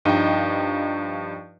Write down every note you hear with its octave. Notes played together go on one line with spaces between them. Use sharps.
G2 F3 D#4 D#5 G5 D#7